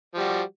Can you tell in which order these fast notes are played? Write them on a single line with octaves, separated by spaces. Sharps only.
F3 G3 F#4